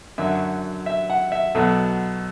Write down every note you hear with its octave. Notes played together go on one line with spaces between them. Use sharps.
F#2 D3 F#3 E5
E5
F#5
E5
B1 B2 F#3 A4